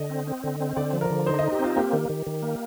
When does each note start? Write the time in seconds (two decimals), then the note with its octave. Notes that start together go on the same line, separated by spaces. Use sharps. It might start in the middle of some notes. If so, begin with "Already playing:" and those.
Already playing: D3 D#5
0.10 C4
0.27 C4
0.44 D3
0.60 C4
0.77 D3 D5
0.93 F3
1.01 A#4
1.10 D3
1.26 D#4 C5
1.39 D#4 D#5
1.52 G4
1.59 C4 F4
1.76 A#3 G4
1.93 D#3
2.09 D#3
2.26 D#3
2.42 A#3